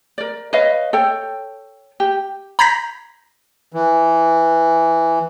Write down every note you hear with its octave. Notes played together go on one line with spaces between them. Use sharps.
A#4 D5
B4 C#5 D#5 F5
A4 C#5 G5
G4
A#5 B5 G6 G#6 A#6 B6
E3